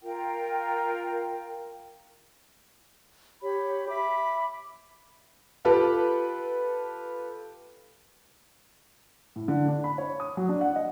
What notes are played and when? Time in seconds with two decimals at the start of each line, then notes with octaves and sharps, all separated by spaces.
0.02 F4 A#4 G5
3.42 G4 C#5 B5
3.87 E5 B5 D6
5.65 F4 G4 A4 B4
9.36 A2
9.48 D3
9.68 D4
9.84 B5
9.98 C#5
10.20 D#6
10.37 F#3
10.49 D4
10.61 F#5
10.76 D#5